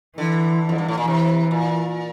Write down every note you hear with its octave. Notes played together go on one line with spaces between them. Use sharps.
D3 E3
F2
G2
A2
A#2
C3 E3
A#2